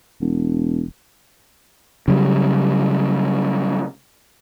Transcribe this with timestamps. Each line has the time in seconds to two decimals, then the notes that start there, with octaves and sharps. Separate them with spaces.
0.20 E1
2.08 C#3 F#3 G3